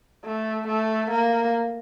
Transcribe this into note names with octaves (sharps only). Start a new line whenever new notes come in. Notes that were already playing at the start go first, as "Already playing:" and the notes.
A3
A3
A#3